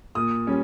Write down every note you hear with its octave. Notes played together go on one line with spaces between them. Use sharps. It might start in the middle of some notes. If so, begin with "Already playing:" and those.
A#2 D#6
G3 C#4